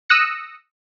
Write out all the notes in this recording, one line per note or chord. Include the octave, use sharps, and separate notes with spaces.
D#6 E6 F#6 A#6 C#7